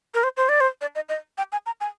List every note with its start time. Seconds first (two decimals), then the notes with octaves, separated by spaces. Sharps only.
0.14 A#4
0.23 C5
0.37 C5
0.49 D5
0.60 C5
0.81 D5
0.95 D#5
1.09 D#5
1.38 G5
1.52 G#5
1.66 A#5
1.81 G#5